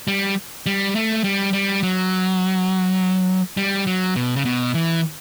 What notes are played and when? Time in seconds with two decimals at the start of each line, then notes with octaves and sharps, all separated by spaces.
0.08 G3
0.66 G3
0.95 A3
1.24 G3
1.53 G3
1.83 F#3
3.57 G3
3.87 F#3
4.16 B2
4.36 C#3
4.45 B2
4.74 E3